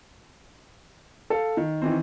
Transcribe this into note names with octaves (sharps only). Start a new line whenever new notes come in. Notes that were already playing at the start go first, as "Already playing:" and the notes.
A4 F5
D#3
D#3 E3 C4